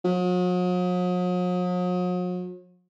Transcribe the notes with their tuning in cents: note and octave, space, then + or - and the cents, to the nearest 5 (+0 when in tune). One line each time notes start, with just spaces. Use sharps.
F#3 -45